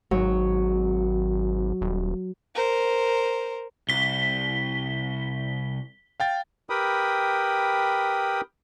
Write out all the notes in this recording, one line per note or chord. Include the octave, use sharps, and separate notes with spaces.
G#1 F#3
D#1
A#4 C5
C2 B6 G7
F5 G5 A6
G4 A#4 B4 G5 B5 D#6